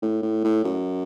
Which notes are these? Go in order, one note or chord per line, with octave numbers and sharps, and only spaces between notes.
A2
A2
A2
F#2